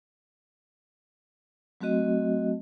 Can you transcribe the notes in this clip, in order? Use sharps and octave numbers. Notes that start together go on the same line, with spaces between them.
F#3 A3 C4 F#4 D#5